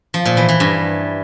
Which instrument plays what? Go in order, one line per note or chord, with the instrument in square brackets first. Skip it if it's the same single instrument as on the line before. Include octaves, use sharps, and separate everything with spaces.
[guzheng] F3
A#2
E3
E3
G2